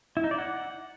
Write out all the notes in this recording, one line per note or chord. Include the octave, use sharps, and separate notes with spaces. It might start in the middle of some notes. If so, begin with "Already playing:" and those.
E4
D#4
D5
F#5